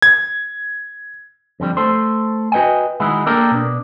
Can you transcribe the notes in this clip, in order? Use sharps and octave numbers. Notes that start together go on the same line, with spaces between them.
G#6
F2 D3 G3
A3 A4 C5
F#4 B4 D#5 G5 G#5
D#3 G#3 D#4 E4 F#4
A#3 D4 G4 A4 A#4
B2 D4